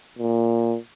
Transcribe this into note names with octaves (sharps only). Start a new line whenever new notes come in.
A#2